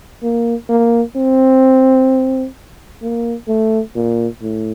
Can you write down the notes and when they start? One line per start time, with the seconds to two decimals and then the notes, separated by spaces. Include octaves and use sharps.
0.23 A#3
0.69 A#3
1.16 C4
3.02 A#3
3.48 A3
3.95 A#2
4.42 A2